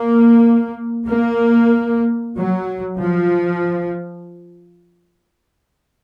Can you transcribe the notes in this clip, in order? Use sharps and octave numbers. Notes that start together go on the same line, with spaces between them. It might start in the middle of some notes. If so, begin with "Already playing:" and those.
Already playing: A#3
A#3
F#3
F3